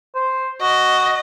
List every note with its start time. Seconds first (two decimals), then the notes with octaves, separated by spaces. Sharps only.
0.15 C5
0.61 F#4 D#5